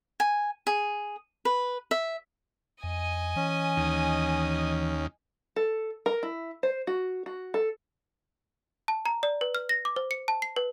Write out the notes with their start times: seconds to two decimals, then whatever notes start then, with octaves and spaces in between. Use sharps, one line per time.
0.20 G#5
0.67 G#4
1.45 B4
1.91 E5
2.84 F2 D#5 G#5
3.36 E3 C#4
3.77 D#2
5.56 A4
6.06 A#4
6.23 E4
6.63 C5
6.87 F#4
7.26 F#4
7.54 A4
8.88 A5
9.06 A#5
9.23 D5
9.41 B4
9.55 F6
9.69 A#6
9.85 D6
9.96 C5
10.11 C#7
10.28 A5
10.42 C7
10.56 B4